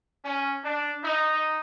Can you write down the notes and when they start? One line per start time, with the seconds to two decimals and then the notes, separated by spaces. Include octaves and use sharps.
0.24 C#4
0.64 D4
1.03 D#4